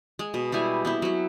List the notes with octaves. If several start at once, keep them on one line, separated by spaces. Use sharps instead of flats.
G#3
B2
G3 G#3 E4 G#5
B3 C4 E4
F#3 E4